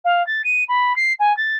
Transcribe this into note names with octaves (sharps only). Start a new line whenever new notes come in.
F5
A6
D#7
B5
C7
G#5
A6